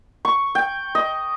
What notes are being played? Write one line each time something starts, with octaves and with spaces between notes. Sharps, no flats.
C#6
G5
D#5